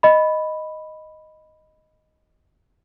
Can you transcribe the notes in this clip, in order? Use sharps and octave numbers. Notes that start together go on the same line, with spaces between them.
D#5 B5